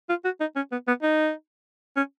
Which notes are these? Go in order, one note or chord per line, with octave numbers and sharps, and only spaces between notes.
F4
F#4
D#4
C#4
B3
B3
D#4
C#4